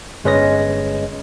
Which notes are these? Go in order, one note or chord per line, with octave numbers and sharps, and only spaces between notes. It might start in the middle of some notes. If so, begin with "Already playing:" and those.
G1 G#3 C#4 B4 D#5 A#6